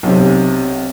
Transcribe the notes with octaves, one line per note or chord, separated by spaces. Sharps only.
B1 C3